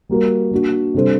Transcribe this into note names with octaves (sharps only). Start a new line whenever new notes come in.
G3 A#3 F#4 A#4
A#3 D4 F#4
C3 G3 D4 A4 C5